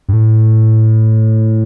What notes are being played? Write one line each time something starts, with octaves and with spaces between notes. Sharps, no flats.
G2
A2